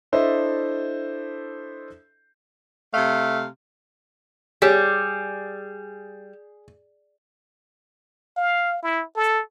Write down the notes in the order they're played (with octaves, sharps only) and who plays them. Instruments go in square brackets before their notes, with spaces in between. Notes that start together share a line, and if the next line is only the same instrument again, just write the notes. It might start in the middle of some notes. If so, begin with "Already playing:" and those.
[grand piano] D4 E4 A4 C5 D#5 E5
[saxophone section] C3 A3 F5
[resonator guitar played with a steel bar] G3 [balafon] G4 C#5 [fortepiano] G#4
[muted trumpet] F5
E4
A4